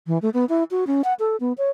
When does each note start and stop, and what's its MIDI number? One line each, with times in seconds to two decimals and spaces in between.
0.07 0.18 52
0.22 0.30 57
0.34 0.45 59
0.49 0.64 64
0.71 0.84 66
0.87 1.02 61
1.04 1.14 78
1.19 1.36 69
1.40 1.53 59
1.58 1.70 73